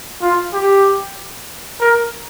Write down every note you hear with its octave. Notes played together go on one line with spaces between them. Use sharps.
F4
G4
A#4